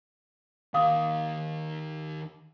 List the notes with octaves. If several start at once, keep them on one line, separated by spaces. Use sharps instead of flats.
D#2 D#3 F5 D6 D#6